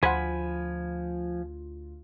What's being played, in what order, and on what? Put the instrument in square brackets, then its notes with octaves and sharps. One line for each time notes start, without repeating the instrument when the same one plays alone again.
[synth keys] D2 F4 [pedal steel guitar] F3 G#5 B5 [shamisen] C5 F#5